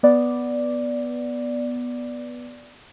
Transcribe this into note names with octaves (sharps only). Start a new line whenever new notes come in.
B3 D5